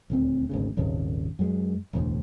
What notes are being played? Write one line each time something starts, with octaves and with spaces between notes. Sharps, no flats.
D#1 D2 C4
G#1 D2 C#3
D#1 G#1 D#2 C#3
F#2 G#3
E1 A1 D2